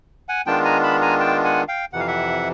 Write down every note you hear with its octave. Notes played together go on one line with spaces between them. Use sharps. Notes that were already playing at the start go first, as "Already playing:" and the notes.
F#5 G#5
D#3 G#3 B3 D4 F4 G5 A5
G#5 A#5
A5 B5
G#5 A#5
G5 A5
F#5 G#5
F5 G5
F2 C3 E3 F#5
F5
E5 F#5